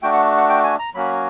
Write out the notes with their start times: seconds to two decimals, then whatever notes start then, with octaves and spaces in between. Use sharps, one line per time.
0.02 A3 D4 F#4 G5
0.13 F#5
0.37 F#5
0.49 G5
0.64 G#5
0.79 A#5
0.94 F#3 A#3 C#4 F#4 B5